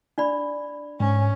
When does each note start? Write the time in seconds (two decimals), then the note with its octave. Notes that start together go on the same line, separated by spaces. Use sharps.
0.18 D4 D5 B5
1.00 G#2 C#4